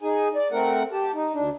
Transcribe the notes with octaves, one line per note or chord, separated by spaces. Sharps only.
D#4 G#4 G#5
D5
A3 C4 A#4 F#5
G4 A5
D#4
D2 D4